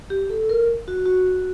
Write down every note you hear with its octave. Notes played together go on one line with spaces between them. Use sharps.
G4
A4
A#4
F#4
F#4